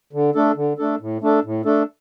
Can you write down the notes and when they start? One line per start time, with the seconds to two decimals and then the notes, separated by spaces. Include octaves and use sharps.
0.13 D3
0.35 A3 D4 A4
0.56 D3
0.78 A3 D4 A4
1.00 A2
1.21 A3 D4 A4
1.44 A2
1.65 A3 D4 A4